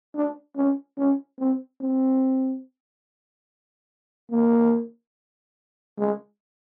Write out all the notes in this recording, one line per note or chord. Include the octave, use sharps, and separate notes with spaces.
D4
C#4
C#4
C4
C4
A#3
G#3